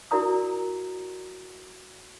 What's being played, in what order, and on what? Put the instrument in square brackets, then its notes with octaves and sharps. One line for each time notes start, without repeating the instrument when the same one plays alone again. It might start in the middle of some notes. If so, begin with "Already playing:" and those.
[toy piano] E4 F#4 A#4 D5 A#5 D#6